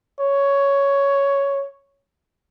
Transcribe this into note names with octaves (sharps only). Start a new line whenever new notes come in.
C#5